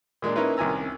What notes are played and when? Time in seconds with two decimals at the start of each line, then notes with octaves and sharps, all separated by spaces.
0.22 A#2 G#3 A#3 D4
0.36 A#3 C#4 D#4 E4 A#4 B4
0.57 C2 D#3 C#4 G#5 A#5 E6